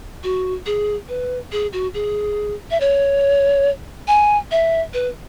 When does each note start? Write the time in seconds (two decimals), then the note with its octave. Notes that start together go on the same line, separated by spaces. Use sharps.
0.24 F#4
0.66 G#4
1.09 B4
1.52 G#4
1.73 F#4
1.94 G#4
2.71 E5
2.80 C#5
4.08 G#5
4.51 E5
4.93 B4